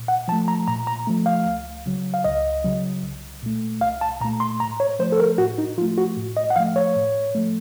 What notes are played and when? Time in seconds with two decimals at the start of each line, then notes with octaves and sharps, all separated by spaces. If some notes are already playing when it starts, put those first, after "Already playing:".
Already playing: A#2
0.08 F#5
0.28 F3 A5
0.32 A3
0.48 A#5
0.68 A#2 A#5
0.87 A#5
1.07 F3 A3
1.26 F5
1.46 C#2
1.86 C#3 F#3
2.14 F5
2.24 C#2 D#5
2.64 C#3 F#3
3.03 C2
3.43 A#2 A3
3.81 C2 F5
4.01 A5
4.21 A#2 A#5
4.25 A3
4.40 C6
4.60 A2 A#5
4.80 C#5
4.99 F3 A3 C5
5.12 A4
5.20 A#4
5.38 A2 F#4
5.58 D#4
5.78 F3 F4
5.82 A3
5.98 F#4
6.17 A2
6.37 D#5
6.50 F#5
6.56 F3 A3 F5
6.76 C#5
6.96 A2
7.35 F3 A3